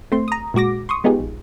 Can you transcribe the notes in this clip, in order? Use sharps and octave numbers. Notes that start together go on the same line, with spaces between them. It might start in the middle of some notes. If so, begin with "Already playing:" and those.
A3 C4 C6
A#5 D#6
A#2 G#3 F#4 D6 A#6
C6 C#6 D#6
G#3 B3 D#4 F4 G4 G#4
A#1